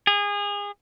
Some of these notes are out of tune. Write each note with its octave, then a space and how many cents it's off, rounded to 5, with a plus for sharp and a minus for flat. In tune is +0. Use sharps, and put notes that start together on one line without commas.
G#4 -30